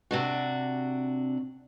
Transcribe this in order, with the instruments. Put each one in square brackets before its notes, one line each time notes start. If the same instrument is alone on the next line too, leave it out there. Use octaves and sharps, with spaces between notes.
[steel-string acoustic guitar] C3 D4 F#4